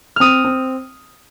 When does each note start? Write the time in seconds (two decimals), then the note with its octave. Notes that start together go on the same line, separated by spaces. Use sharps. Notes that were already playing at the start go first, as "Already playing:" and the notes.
0.16 C4 D#6 F6
0.45 C4